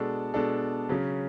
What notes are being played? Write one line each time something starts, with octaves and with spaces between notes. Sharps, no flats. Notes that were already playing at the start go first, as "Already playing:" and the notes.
Already playing: B2 G#3 D4 A4
B2 G#3 D4 A4
C#3 F#3 C#4